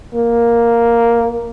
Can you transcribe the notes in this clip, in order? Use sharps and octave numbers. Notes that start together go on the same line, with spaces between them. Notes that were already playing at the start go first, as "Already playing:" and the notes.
A#3